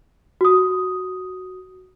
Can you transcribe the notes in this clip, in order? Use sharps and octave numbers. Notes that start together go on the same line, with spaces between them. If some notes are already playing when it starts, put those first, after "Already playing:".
F#4 D#6